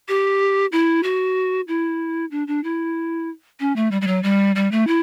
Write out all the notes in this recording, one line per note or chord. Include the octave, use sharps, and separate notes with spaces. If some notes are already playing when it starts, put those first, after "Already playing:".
G4
E4
F#4
E4
D4
D4
E4
C#4
A3
G3
G3
F#3
G3
G3
A3
E4